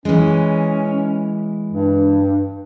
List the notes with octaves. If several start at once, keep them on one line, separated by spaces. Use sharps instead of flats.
E3 G#3 C#4
G2